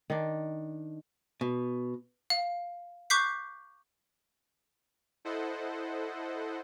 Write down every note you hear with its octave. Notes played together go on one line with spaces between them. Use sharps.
D#3 D4
B2
F5
C#6 D6 F#6 G6 B6 C7
E4 A4 C5 D#5 F#5